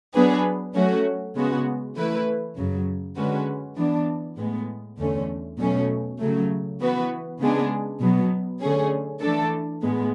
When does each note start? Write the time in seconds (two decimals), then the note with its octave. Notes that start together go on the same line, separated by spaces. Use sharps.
0.14 F#3 B3 D4 G#4 B4
0.74 F#3 A3 C#4 F#4
1.35 C#3 G#3 B3 F#4
1.96 E3 A3 E4 B4
2.56 F#2 C#3 F#3
3.16 D3 G#3 C#4 F#4 B4
3.77 E3 B3 D4
4.38 A2 G#3 B3
4.98 E2 D3 A3 C#4
5.58 B2 F#3 A3 C#4
6.19 C#3 F#3 A3
6.80 E3 B3 F#4 B4
7.39 C#3 G#3 B3 D4 G#4
8.00 B2 F#3 B3
8.61 D3 A3 C#4 G#4
9.21 E3 A3 D4 A4
9.82 A2 G#3 B3